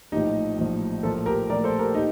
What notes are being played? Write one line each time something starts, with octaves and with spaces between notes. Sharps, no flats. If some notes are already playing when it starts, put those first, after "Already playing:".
A#1 A2 F3 D#4 G4
A#1 A2 F3
A#1 A2 F3 A#3 F4 A4
G4 A#4
A#1 A2 F3 A#3 A#4 D5
A4 C5
G4 A#4
A#2 D#4 G4